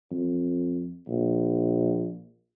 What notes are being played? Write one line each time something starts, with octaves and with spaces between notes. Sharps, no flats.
F2
A#1